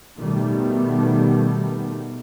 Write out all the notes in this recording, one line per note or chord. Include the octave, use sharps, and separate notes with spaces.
B2 D#3 G3 A3 B3